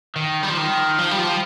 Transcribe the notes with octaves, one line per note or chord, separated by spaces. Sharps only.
D#3
G3
F3
D#3
F3
G3
F3